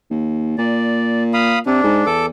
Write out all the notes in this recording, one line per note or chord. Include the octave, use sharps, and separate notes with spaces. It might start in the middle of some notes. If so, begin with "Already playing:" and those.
D#2
A#2 D5
F5 B5 D#6
C3 D4
G#2
E2 A4 D6